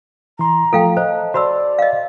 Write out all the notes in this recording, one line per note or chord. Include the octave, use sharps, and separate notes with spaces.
E3 A#5 C6
F3 A3 F4 A4 F5 G5
C5 D#5
A5
F#4 C5 D5 A5 B5 E6
D#5 F5